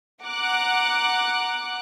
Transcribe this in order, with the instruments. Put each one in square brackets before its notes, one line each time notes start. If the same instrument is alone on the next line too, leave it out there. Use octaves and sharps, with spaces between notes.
[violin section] F#5 A#5 D6 F#6